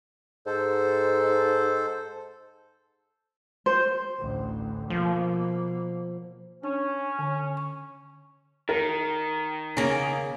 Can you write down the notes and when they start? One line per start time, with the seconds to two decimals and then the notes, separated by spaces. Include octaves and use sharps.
0.46 G#2 A4 C5
3.66 C5
4.19 A1 D2
4.90 B2 F3 A#3
6.63 C#4 D4
7.19 D3
7.57 C#6
8.69 D#3 A#4
9.77 C#3 A#3 C#4